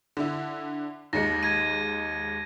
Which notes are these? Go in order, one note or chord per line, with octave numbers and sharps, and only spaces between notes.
D3 E4
D#2 G#2 G#3 A#6 C#7
G#6 A#6 D#7